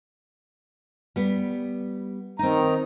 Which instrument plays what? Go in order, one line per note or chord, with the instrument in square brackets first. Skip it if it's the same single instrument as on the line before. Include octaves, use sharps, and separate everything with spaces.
[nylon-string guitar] G3 B3
[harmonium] D#3 A#5 [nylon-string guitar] C4 D#4